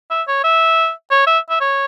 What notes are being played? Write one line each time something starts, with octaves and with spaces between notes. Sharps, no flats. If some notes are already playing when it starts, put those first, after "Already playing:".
E5
C#5
E5
C#5
E5
E5
C#5